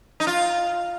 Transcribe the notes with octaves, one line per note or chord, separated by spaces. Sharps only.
D#4
F4